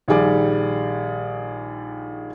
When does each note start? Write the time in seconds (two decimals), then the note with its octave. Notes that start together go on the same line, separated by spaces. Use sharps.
0.08 A#1 D#3 G3 G#4 D5